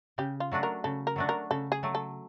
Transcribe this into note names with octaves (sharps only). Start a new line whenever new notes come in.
C#3 G4
F4
F#3 A3 D4 F#4
A#4
C#3 A4
A#4
F#3 A3 D4 F#4
A#4
C#3 A4
G#4
F#3 A3
A4